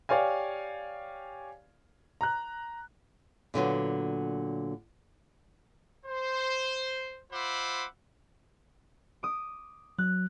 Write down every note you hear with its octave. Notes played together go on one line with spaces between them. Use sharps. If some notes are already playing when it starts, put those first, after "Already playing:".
G4 C#5 D5 F5 G#5
A#5 F#6
A#2 D3 F#3 B3
C5
F4 C5 E5 F#5 B5 D6
D6 D#6
F#3 F#6